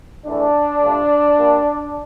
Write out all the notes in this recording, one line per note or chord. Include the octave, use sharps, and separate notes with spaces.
E2 E3 A3 D4
C3 F3 A3
A#2 G3 A#3